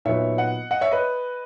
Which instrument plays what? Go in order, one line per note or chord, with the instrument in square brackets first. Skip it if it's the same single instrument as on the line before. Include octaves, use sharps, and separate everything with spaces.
[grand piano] A#2 F#3 B3 D#4 C#5 E5
D#5 F#5
D#5 F#5
C#5 E5
B4 D#5